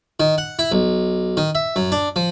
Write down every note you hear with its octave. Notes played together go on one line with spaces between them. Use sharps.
D#3
F#5
E4
B1
D#3
E5
F#2
D4
F3